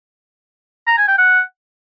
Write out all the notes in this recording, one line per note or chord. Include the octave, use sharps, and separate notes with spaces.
A#5
G#5
G5
F#5